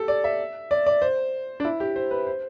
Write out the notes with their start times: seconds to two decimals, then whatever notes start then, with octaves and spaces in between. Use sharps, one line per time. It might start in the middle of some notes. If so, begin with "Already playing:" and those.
Already playing: G4 A4
0.08 D5
0.24 E5
0.71 D5
0.86 D5
1.02 C5
1.60 D4
1.65 E4
1.80 G4
1.96 C5
2.11 B4
2.27 C5